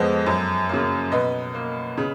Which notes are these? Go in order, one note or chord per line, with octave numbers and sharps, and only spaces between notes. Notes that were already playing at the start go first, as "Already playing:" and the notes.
Already playing: F2 F3 G#3 B3
F#2
C#3 F#3 A#3
B2 B4 D#5
A#3
C#3